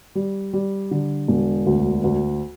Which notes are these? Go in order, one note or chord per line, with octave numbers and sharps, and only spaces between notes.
G3
G3
D3
E1
D2
D2